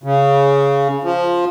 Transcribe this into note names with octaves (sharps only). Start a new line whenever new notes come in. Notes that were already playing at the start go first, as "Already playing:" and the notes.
C#3
F3